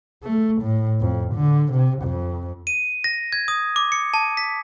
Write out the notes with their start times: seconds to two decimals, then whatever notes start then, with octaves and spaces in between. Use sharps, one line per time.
0.23 A3
0.62 A2
1.00 F2
1.35 D3
1.72 C3
2.03 F2
2.67 D#7
3.04 A#6
3.33 G#6
3.48 D#6
3.76 D6
3.92 C#7
4.14 A5
4.37 B6